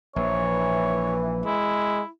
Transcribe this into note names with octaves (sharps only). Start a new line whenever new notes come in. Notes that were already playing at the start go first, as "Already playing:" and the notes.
A#1 E3 C#5
G#3 E4